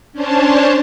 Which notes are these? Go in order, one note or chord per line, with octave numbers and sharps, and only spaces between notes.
C#4 D4 C5 C#5 A5